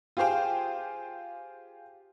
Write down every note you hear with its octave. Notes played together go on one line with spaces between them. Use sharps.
F4 G4 G#4 C5 F5 G5